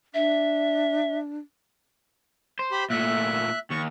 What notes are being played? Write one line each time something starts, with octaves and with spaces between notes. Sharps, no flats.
D4 E5
C5
G4 B5
A#2 A3 E5 F#6
D#2 C#6